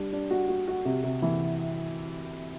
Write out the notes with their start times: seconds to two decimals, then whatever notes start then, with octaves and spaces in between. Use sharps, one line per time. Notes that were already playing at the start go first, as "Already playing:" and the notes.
Already playing: G3 D4
0.13 D4
0.31 F#4
0.49 F#4
0.67 F#4
0.85 C3
1.04 C3
1.22 E3